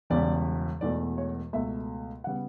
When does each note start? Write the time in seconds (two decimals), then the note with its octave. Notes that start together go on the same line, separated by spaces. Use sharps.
0.10 E1 E2 C#3 G3 D5
0.81 E1 E2 B2 A3 D5
1.18 C#5
1.53 C#2 B2 A3 E5
2.24 C#3 G3 B3 F#5